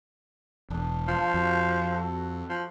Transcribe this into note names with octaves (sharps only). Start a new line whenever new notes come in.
E1 D4 D#6
F3 F4 F5 A5
F2 F#4
F#4 A4
F3